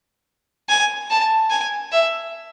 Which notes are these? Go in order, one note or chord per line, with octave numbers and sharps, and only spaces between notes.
G#5
A5
G#5
E5